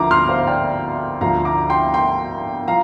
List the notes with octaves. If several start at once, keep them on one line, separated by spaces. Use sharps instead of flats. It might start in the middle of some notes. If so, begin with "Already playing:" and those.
Already playing: D2 D3 F3 A#5 D6
C6 F6
C5 F5
D5 G5
D2 D3 F3 F5 A#5
A#5 D6
G5 C6
G5 C6
F3 F5 A#5